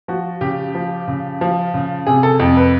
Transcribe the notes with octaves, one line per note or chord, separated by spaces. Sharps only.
F3 F#4
C#3 G4
F3
C#3
F3
C#3
C3 G#4
A4
F2
B4